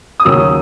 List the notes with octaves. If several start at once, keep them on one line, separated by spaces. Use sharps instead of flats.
D#6
D#2 C#3 F#3 E6